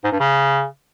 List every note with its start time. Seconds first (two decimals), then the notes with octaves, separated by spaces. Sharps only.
0.04 G#2
0.12 G2
0.20 C#3